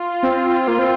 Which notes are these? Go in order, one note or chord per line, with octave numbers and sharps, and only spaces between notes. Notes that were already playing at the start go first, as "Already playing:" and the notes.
Already playing: F4
C4
A#3
C4